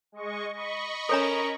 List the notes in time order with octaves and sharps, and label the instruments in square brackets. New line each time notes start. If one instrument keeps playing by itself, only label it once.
[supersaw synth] G#3 D#5 C#6
D#5 B5 C#6
[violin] C#4 [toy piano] A4 C#5 A#5 [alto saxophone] A#4